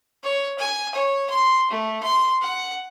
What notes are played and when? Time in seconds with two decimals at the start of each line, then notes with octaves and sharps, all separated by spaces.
0.23 C#5
0.58 G#5
0.94 C#5
1.29 C6
1.70 A3
2.03 C6
2.41 F#5